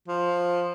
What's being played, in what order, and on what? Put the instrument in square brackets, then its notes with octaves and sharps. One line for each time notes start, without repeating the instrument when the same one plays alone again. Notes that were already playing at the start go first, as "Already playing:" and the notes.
[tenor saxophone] F3